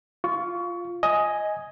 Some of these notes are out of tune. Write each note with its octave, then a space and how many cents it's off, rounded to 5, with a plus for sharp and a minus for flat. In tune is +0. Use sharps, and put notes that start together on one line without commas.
F4 +0 C#6 +25
D#5 +10 G#5 +0